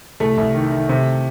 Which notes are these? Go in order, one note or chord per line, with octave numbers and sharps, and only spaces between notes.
C2 A3
C2
D#3
D#3
C3